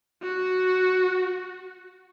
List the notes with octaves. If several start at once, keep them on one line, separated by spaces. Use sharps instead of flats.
F#4